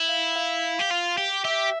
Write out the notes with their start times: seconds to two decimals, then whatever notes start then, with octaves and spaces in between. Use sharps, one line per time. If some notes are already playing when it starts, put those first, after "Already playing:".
Already playing: E4
0.08 F5
0.36 F5
0.79 G4
0.90 F4
1.17 G4
1.45 G4 E5